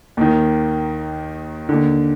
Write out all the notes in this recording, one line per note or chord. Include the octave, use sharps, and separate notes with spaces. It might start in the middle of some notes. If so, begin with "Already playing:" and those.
D#2 D#3
D#2 D3